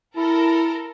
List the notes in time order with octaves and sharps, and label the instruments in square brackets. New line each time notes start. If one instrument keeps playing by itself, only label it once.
[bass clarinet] E4 [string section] A4 A#4